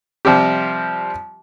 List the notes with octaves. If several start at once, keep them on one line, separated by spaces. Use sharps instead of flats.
C3 F3 G3 C4 G4